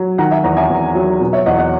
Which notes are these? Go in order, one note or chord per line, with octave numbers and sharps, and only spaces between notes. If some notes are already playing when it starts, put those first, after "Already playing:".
Already playing: F#3
D#3 F#5 A#5
E5 G#5
E2 F#5 A#5
E5 G#5
E2
F#3
B2
C#5 E5
E2 D#5 F#5
D#5 F#5